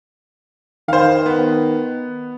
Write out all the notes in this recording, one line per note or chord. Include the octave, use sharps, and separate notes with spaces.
D#3 C5 F5
B3